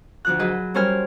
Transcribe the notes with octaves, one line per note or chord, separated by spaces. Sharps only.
D2 F3 F#6
F#3 G#4 B4 D#5
G3 C#4 A#4 C5 G#5 F6